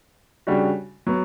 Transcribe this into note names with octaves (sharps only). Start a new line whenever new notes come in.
C#3 G3 D4 F#4
F#3 B3